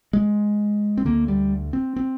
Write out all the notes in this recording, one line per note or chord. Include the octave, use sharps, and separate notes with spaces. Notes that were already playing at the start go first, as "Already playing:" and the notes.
G#3
C4
D2 D3 A#3
G3
C4
C4